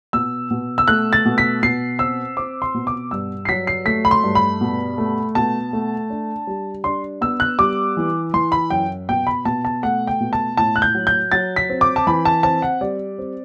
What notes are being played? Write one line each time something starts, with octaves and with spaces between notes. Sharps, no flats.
B2 E6
B2
E6
A3 F#6
A6
B2
B6
B2 C7
C4 E6
C4 D6
C6
B2
D6
G2 E6
C7
F#3 B6
C7
A3 B6
B5
C6
G2
B5
B2
A3
B2 A5
A3
D4
G3
D4 C6
B3 E6
F#6
G3 D6
E3
E3 C6
B5
F#2 G5
B2 G5
B5
B2 A5
A5
A3 F#5
G5
B2
A5
A2 A5
F#6
G6
F#3
G6
F#3 A6
B6
C4
D6
A5
E3 B5
A5
C4 A5
F#5
G3 D5
C4